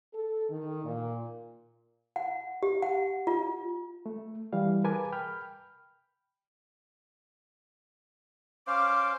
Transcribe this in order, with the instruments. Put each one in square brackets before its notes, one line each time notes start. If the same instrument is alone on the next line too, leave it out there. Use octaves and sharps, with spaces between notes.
[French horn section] A4
D#3
A#2
[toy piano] F#5
G4
F#5
F4
[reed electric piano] A3
E3 G3 F5
G#4 A#4 B4 G#5 A5 D6
G5 B5 F6
[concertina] C#4 C5 F5 [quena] D6